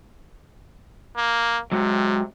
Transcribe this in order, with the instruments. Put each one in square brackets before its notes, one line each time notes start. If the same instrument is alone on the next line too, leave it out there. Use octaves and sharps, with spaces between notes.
[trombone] A#3
[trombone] C3 [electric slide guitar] F#3 G#3 F#4